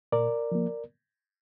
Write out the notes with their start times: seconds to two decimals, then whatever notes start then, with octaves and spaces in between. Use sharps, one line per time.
0.12 A#2 A#4 D5
0.52 F3 A#3